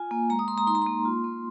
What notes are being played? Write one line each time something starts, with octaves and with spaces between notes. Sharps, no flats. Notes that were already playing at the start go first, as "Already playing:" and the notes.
Already playing: F4 G#5
A#3
G#3 A#5
D#6
G#3 C6
A#5
D#4 C6
A#5
A#3 C6
F4
A#3